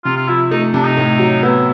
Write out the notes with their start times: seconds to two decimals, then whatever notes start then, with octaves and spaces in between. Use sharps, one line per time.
0.05 C3 F4
0.16 F4
0.28 F3 E4
0.51 A3 D#4
0.74 C3 D4
0.85 D#4
0.97 A2
1.19 F#3
1.43 B3 E4